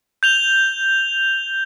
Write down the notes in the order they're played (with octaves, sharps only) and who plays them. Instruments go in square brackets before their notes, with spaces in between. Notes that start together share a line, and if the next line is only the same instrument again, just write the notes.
[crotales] G6 F7 G7